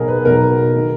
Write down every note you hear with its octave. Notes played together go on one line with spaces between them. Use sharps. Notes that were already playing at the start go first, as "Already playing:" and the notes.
Already playing: B1 B2 G#4 A#4
B4
B1 B2 A#4
D#3